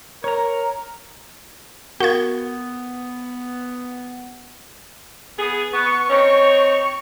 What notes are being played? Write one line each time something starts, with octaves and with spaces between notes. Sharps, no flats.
A#4 C#5 A#5
B3 F#4 A#4 F5 G#6
B3 G#4
B3 C#6
C4 D#4 C#5